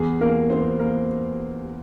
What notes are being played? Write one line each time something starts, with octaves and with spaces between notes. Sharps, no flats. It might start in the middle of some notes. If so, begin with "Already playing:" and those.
Already playing: E2 G#4
E3 A#3 A#4
E3 C4 C5
A#3 A#4